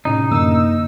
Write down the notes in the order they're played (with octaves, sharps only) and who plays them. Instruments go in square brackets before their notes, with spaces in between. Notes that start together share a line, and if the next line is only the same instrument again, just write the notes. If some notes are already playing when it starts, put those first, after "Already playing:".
[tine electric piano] A2 C3 C#4 [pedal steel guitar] D#4
[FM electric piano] F#2 D3 A#3 [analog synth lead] E6